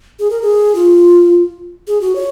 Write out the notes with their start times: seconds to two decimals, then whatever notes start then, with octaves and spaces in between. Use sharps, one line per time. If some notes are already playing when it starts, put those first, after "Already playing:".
0.19 G#4
0.30 A#4
0.42 G#4
0.75 F4
1.87 G#4
2.01 F#4
2.16 C#5